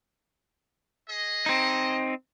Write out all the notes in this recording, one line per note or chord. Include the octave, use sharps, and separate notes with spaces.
G#4 D#5
C4 D#4